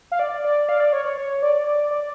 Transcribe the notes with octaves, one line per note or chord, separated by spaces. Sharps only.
F5
D5
D5
F5
D5
C#5
C#5
C#5
D5
D5
D5